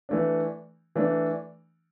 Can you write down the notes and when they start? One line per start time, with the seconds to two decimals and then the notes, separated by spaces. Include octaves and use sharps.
0.09 E3 A3 D4
0.96 E3 A3 D4